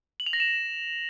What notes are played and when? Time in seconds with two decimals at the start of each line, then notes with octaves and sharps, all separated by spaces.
0.20 F#7
0.26 F7
0.33 A#6
0.40 E7